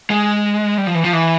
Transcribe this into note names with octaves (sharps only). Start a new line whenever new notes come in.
G#3
G3
F3
E3
F3
E3